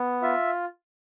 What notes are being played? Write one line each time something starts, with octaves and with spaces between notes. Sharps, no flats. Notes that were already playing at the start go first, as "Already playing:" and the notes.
Already playing: B3
F4 E5